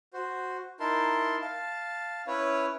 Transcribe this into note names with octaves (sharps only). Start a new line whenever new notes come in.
F#4 C5
D#4 E4 A#4 A5 C6
F5 A5
C#4 E4 B4 C#5